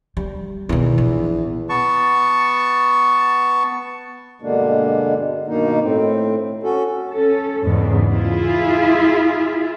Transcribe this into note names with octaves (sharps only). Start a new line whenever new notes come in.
G3
E2 B2 D#3
A#1
B3 A5 C#6
G2 B2 D3 G#3 A#3 D4
G2 B2 D#3 A#3 D#4
A2 C4
C#4 F#4 A4
C#4 A4
E2 G#2 C#3 B3
E4 F4 G#4 E5